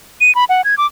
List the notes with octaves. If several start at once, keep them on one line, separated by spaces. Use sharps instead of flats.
D#7
B5
F#5
G#6
D6